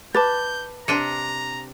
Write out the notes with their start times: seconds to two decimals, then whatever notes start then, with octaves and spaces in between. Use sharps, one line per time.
0.15 B4 A5 D6 G6 A6
0.88 C3 D4 G5 A#5 C#7 D#7